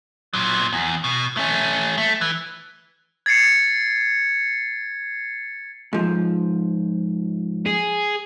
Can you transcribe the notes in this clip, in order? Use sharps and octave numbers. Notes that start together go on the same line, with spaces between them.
A#2 F#3
E2
B2
A3 C#4
A3
E3
G#6 A6 C7 C#7
G#2 F3
G#4